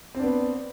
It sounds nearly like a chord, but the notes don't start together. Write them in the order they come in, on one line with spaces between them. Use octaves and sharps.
C4 D4 B3